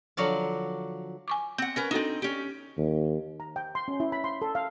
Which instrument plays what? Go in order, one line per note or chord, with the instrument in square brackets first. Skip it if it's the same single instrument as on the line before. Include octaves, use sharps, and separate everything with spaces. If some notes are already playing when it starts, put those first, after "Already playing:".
[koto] D3 F3 F#3 F#4 D5 F5
[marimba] G#5 C#6 D6
[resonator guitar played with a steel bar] C4 F#5 [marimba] G6
[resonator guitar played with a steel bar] C#4 A#4 B4 [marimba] A#6
[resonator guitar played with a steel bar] C4 D#4 [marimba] D4 F#4 A4
[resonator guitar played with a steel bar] C#4 G4
[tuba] D#2
[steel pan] A#5
G5
C6
C#4
E4
B5
C6
A4
F5